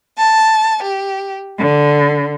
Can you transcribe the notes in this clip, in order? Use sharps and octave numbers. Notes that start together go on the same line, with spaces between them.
A5
G4
D3